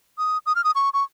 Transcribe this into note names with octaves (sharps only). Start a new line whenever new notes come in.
D#6
D#6
F6
D#6
C#6
C#6